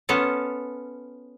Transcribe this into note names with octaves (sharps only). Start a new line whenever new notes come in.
B3 C#4 F4 A4